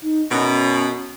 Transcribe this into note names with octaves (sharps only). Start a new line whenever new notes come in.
D#4
F#2 B2 C#4